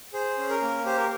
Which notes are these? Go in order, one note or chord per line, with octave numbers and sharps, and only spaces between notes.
G#4 C5
C#4
A#4
A#3
G4 C5
A#4